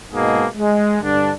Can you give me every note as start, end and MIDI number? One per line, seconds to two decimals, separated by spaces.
0.12 0.45 44
0.12 0.45 47
0.12 0.45 56
0.12 0.45 58
0.12 0.45 68
0.56 0.98 56
1.01 1.31 43
1.01 1.31 50
1.01 1.31 62